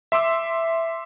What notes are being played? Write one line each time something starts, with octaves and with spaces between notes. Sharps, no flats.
E5 C6 D6 E6